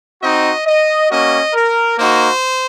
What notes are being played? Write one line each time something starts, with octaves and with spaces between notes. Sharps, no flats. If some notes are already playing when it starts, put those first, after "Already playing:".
C4 D#4 F#4 D#5
D#5
A#3 C#4 F#4 D#5
A#4
A#3 D#4 F#4 C5